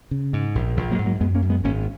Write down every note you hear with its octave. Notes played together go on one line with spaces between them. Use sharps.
C#3
G#2
A#1
A#1 F3
F#3 A#3
G#2
F#3 A#3
F#2 G#3 B3
A#3 C#4
F#2
G#3 B3
G#1 A#3 C#4